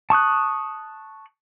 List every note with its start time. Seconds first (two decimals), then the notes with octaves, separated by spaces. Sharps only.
0.10 A5 C#6 D#6 F#6